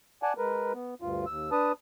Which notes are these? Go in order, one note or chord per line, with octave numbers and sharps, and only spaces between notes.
D5 F#5 G#5 A5
G#3 A#4 B4
B3
D2 G2 F4
D#2 E6
D4 B4 A5 D#6